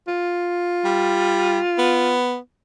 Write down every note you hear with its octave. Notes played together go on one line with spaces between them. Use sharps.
F4
G3
B3